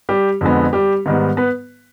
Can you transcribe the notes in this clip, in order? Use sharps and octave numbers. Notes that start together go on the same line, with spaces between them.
G3 G4
F2 D3 G#3 B3
G3 G4
G#2 D#3 G3 B3
B3 B4